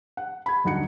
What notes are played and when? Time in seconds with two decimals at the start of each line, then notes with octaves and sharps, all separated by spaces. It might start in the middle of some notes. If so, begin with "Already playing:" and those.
0.17 F#5
0.46 B5 G#6
0.64 D#1 F#2 D3 D#4 F#5 C#7